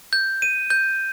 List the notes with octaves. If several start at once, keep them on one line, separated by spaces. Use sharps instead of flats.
G6
D#7
G6